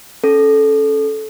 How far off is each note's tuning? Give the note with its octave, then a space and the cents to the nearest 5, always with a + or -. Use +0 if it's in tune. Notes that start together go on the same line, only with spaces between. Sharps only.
C#4 +0 A4 -15